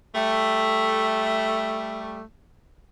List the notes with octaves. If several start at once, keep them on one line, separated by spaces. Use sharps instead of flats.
G3 A3